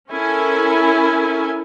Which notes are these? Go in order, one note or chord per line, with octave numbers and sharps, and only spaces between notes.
C#4 E4 A4 A#4 G#5